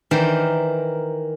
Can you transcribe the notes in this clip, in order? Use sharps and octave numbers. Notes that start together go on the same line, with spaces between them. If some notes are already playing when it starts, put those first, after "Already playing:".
D#3 E3 A#4 C5 D5 C6